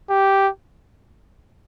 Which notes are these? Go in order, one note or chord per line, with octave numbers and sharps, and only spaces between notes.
G4